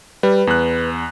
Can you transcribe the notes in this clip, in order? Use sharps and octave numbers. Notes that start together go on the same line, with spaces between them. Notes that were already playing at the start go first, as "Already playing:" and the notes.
G3 B4
E2 F#6